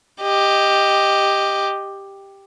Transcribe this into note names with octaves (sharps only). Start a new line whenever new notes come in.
G4 D#5